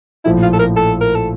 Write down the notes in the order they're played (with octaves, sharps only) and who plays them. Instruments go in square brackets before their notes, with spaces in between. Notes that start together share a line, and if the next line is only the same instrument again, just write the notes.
[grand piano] A#1 A2 F3 [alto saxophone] E4
[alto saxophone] F4
A4
A#4
A4
A#4
A4